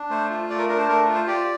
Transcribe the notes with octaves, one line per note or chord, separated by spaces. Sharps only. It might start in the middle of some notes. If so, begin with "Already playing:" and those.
Already playing: D4
A3 C5
F4
A3 D5
A#4
D4 A#4
C5
A3 A#4
F4
C5
G4 D5